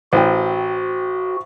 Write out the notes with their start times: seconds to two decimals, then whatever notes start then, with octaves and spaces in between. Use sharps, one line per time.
0.13 A1 F#4 C5 G5